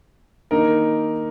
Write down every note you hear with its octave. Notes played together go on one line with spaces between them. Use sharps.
D#3 A#3 D#4 A#4